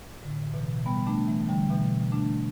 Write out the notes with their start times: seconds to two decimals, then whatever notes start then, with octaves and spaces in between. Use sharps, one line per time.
0.23 A2 D3
0.54 B2 E3
0.86 G3 B3
1.07 A3 D4
1.27 E3 A3
1.49 D3 G3
1.70 B2 E3
2.12 A3 D4